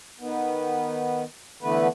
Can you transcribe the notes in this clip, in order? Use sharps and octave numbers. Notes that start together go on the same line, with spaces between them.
D#3 B3
D3 E3 A3 B3 B4